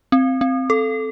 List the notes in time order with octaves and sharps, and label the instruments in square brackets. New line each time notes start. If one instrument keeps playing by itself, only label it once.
[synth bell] C4
C4
A4